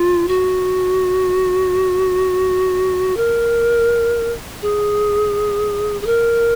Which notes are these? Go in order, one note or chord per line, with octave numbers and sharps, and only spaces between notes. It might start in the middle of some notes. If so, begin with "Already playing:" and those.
Already playing: F4
F#4
A#4
G#4
G#4
A#4